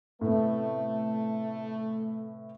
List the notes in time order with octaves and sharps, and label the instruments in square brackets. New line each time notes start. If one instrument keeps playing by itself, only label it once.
[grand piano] A2 C3 B3 [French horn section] A3